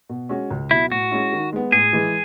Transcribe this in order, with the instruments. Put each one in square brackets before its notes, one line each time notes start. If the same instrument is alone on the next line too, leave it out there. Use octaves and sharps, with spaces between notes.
[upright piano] B2
G#3 C#4 F#4
C#2
[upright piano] B2 F#3 [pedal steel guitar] E4
[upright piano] A2 [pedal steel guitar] F#4
[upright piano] G#3 C#4 E4
D#3
G#3 B3
[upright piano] A2 [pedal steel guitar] G#4
[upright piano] E3 G#3